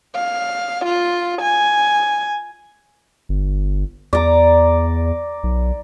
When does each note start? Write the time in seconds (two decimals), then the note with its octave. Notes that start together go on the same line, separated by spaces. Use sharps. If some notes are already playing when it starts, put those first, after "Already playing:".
0.15 F5
0.85 F4
1.42 G#5
3.29 G1
4.13 E2 D5 A#5
5.44 B1